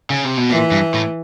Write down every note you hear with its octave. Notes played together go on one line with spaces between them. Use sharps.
C#3
C3
B2
A#2 E3
G2
A2